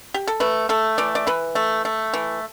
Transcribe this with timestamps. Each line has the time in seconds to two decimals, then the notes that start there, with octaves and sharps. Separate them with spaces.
0.14 G4
0.28 A4
0.40 A3 B4
0.69 A3 A4
0.98 E3 D5
1.15 D5
1.27 E3 B4
1.55 A3
1.85 A3
2.14 E3